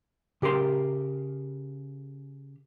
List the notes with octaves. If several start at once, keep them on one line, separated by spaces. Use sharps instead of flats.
C#3 G4 A#4 C6